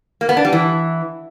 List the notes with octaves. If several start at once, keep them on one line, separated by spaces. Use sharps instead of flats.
A#3
B3
D4
G3
E3